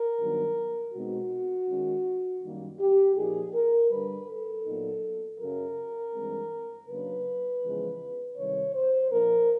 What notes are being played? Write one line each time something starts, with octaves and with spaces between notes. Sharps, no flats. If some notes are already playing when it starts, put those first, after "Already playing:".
Already playing: A#4
G2 D#3 F#3 B3
B2 G#3 C4 D#4 F#4
D#3 G#3 C#4
F#2 D#3 G3 A#3
G4
A#2 F3 A#3 D#4 G#4
A#4
G2 D3 G3 B4
A4
A#2 F#3 B3 D#4
F#2 C#3 F#3 A#4
G2 E3 G#3 C4
C#3 F#3 A#3 D4 B4
E2 C#3 F3 G#3
C3 D#3 G3 C#5
C5
A#2 F3 A#3 D4 A#4